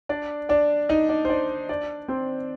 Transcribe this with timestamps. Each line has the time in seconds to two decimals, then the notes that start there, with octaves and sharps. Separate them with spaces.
0.09 D4 D5
0.49 D4 D5
0.89 D#4 D#5
1.09 D4 D5
1.25 C5
1.29 D4 D5
1.69 D4 D5
2.08 C4 C5